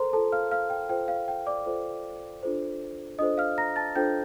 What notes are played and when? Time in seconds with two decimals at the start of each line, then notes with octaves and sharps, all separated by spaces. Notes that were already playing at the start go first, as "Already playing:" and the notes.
Already playing: A4 A#4 C5 A#5 C6
0.12 F4 A4 C5 A5
0.32 F5 F6
0.51 F5 F6
0.70 G5
0.89 F4 A4 C5 G5
1.08 F5
1.28 G5
1.47 D5 D6
1.66 F4 A4 C5
2.43 D4 F4 A4 C5
3.19 D4 F4 A4 C5 D#5 D#6
3.38 F5 F6
3.58 A#5 A#6
3.76 A5 A6
3.95 D4 F4 A4 C5 G5 G6